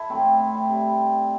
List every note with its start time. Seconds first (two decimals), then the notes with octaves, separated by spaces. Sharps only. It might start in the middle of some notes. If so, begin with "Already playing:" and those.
Already playing: E4 A4
0.10 A2 F#3 A3 C4
0.25 C4
0.39 C4
0.54 E4
0.69 C3 G3 E4